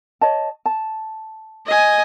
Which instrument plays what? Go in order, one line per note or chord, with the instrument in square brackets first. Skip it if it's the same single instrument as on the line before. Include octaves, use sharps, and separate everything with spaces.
[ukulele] C#5 D#5 A5
A5
[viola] D#5 G#5